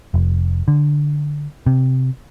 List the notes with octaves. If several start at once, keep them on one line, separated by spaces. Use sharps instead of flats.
F1
D3
C3